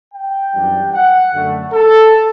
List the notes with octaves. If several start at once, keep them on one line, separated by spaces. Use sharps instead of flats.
G5
F#2 E3 G3 D4
F#5
F#2 D3 A3
A4